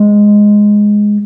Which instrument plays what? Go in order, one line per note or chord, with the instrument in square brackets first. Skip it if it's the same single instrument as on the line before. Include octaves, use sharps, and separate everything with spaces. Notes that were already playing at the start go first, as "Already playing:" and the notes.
Already playing: [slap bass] G#3